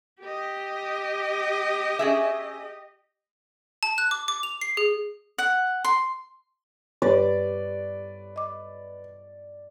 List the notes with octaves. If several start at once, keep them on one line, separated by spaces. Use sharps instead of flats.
G4 D#5
C#4 G#4 E5
A5
F#6
D6
D6
F7
C7
G#4
F#5
C6
G2 G3 G4 B4 D5
D#5 D6